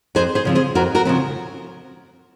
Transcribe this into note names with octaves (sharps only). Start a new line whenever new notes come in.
F2 G#4 C5
G#4 C5
C#3 F3 C4
G#4 C5
F2 F#4 A#4
F#4 A#4
C#3 F3 C4